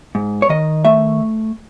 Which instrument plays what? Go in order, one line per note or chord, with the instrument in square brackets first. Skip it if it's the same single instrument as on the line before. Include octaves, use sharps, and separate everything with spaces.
[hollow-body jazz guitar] G#2
C#5
D#3 D#5
A3 E5